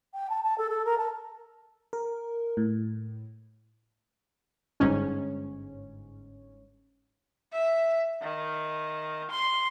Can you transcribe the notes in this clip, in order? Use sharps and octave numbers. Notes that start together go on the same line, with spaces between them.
G5
A5
A5
A4
A4
A#4
A5
A#4
A2
G1 G#2 C#4
E5
D#3
C6